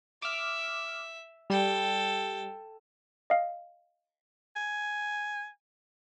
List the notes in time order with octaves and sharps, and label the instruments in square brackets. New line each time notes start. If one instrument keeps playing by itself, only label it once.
[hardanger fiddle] E5 [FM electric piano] D6 F6
[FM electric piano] G3 [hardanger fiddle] A4 G5
[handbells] D#5 F5
[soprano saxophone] G#5